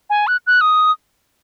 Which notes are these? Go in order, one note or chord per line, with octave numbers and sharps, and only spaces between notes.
G#5
F#6
F#6
D#6